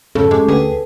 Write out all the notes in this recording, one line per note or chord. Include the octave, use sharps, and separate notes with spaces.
F2 G#2 C#3 A4
G#3 C#4 G4 D6
D2 G#4 B4 G5